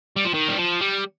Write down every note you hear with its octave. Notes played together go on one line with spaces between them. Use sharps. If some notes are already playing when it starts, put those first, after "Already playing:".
G3
F3
D#3
G3
F3
G3